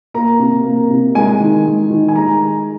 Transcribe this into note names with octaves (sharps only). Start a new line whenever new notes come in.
A#3 A#5
C3
A#3
C3
G#3 G#5
D#3
G#3
D#3
G#5
G#3 A#5